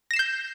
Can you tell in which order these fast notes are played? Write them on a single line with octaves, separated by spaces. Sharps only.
A#6 E7 C7 G6